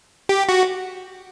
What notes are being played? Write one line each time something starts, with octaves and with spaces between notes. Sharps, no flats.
G4
F#4